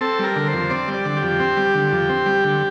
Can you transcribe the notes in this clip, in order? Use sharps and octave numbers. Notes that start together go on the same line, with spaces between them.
C4 A4
G3 A#4
D3
C5
F2
C4 D5
G3
D5
D3
G4
F2
C4
G3
D3
F2
C4
G3
D3